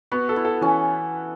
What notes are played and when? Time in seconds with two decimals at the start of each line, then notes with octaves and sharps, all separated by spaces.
0.11 B3 F#4
0.29 A4
0.36 E4
0.45 A4
0.61 E3 C#4